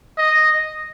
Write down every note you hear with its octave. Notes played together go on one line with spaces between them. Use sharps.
D#5